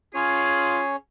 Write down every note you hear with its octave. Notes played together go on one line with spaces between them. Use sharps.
C#4 F4 G#4 C#5